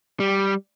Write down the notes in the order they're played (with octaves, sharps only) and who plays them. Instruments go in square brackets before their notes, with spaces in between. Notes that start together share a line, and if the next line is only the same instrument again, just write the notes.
[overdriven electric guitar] G3